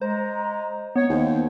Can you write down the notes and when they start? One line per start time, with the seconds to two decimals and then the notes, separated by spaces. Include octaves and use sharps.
0.01 G#3 C5 A#5
0.96 B3 C#5
1.09 D#2 C#3 C5